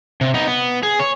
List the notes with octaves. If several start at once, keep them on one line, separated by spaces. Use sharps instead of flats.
C3
B3 D#4
B3
G#4
C#5